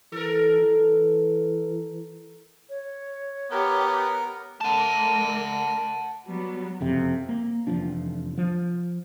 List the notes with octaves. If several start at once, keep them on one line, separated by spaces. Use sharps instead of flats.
E3 A4 A#4
E3
C#5
B3 G4 A#4
A3 A#4 F#5 A5
F#3 G3 B3
F#1 F2 C3
A#3
F1 E2 F3 D4
F3